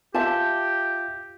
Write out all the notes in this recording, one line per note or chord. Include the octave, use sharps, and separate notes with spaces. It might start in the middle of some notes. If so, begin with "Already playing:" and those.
F4 G4 E5 A5